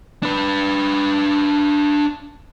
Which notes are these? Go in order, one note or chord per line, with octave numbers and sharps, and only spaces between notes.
D4 B4